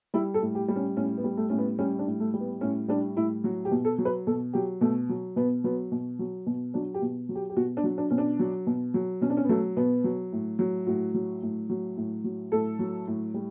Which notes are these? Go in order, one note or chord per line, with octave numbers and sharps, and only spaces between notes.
G3 E4
A4
A2
G4
G3
C#4
A2 C#4
B3
G3
A3
A2 C#4
B3
G3 C#4
D4
A2
A3
G3
B3
A2 C#4
G3 D4
A2 E4
F#3 F#4
G4
B2
A4
F#3
B4
B2 A4
F#3 G4
B2 A3
F#3
B2 B3
F#3 B3
B2
F#3
B2
F#3 D4
G4
B2
F#3
G4
G4
B2 F#4
D4
F#3
D4
B2 C#4
D4
F#3
B2
F#3
B2 C#4
D4
C#4
B3
F#3 A3
B2 B3
F#3
A2
F#3
A2 F#4
F#3
A2
F#3
A2
F#3
A2 A4
F#3
A2
G3